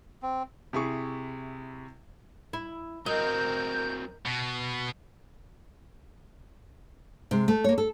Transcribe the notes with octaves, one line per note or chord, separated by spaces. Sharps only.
C4
C3 E4 G#4 C#6
E4
F#3 C4 A#4 D#5 G6
B2
C3 G#3
A3
A#3 C#5
A4